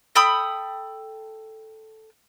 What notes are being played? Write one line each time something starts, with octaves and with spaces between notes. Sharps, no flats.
A4 G5 B5 D#6